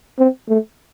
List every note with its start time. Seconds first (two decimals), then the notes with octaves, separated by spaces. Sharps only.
0.19 C4
0.49 A3